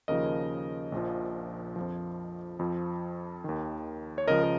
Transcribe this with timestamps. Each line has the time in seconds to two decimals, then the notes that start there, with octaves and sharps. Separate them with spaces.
0.08 D#2 C#3 F3 A#4 D#5
0.92 A#1 A#2 F3
1.76 F2 F3
2.59 F2 F3
3.44 D#2 D#3
4.18 C#5
4.28 C#2 C#3 F3 A#4 D#5
4.44 A#4